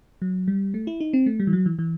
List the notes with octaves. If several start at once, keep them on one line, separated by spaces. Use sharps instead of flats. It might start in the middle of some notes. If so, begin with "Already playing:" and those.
F#3
G3
A3
E4
D#4
C4
A3
G3
E3
F#3
E3
E3